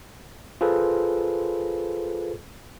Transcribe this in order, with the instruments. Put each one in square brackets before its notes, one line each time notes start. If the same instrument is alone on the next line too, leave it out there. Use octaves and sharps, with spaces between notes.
[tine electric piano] F4 G#4 A4 B4 C5